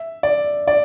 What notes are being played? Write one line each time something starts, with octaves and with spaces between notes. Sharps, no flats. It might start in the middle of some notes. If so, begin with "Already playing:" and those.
Already playing: E5
D5
D5